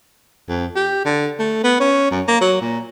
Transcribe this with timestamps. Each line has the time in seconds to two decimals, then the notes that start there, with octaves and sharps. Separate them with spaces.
0.49 F2
0.76 G4
1.05 D3
1.39 A3
1.64 B3
1.80 C#4
2.11 F#2
2.28 A#3
2.41 F#3
2.61 A#2